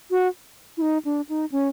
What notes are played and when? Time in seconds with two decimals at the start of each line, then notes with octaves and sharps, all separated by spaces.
0.11 F#4
0.77 E4
0.82 D#4
1.05 D4
1.29 D#4
1.52 C#4